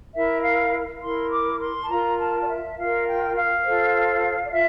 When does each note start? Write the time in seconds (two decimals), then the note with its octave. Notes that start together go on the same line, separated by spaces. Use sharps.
0.14 E4 A#4 E5
0.43 F5
1.02 E4 A#4 C6
1.31 D6
1.60 C6
1.83 A5
1.89 F4 A#4 A#5
2.18 A5
2.41 D5
2.49 E5
2.77 F4 A#4 F5
3.06 G5
3.36 F5
3.65 F4 A4 C5
4.45 D5
4.52 F4 E5